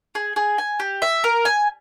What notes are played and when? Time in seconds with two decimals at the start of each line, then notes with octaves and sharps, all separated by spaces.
0.15 G#4
0.36 G#4
0.58 G#5
0.80 G4
1.02 E5
1.24 A#4
1.45 G#5